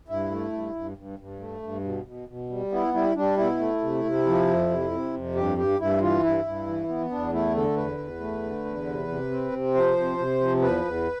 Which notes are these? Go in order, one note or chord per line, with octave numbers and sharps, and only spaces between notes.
G2 E4
A3
G2
G2
G2
G2
A3
G2
B2
B2
B2
G3
B3 E4
G3 E4
G3 D4
B2 E4
A3
C3
C3
F3
F2
C3
C3
F2
G2 G4
G2 G4
G2 E4
E3 F4
G2 E4
G2
E3
B3
E2 D4
A3 E4
D3 A4
E2 B4
E2
A3
D3
E2
C3
C3
C4
C3
F3 C5
C3
C3
F3
E2 B4
E2